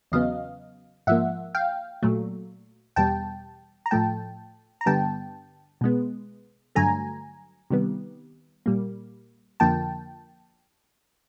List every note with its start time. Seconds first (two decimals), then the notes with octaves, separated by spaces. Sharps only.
0.12 E2 C#3 F#3 B3 D#5 F5
1.07 G#2 F3 A#3 E5 F#5
1.55 F5 G5
2.03 A#2 F#3 A3
2.96 E2 B2 G3 G5 A5
3.86 A#5
3.91 A2 F3 A3 G5 A5
4.81 A#5
4.86 G2 D3 G3 B3 G5 A5
5.81 B2 G#3 B3
6.75 G2 D3 F#3 A3 G#5 A#5
7.70 C3 D#3 G3 B3
8.66 A#2 G3 A#3
9.60 F2 D3 F3 A#3 G5 A5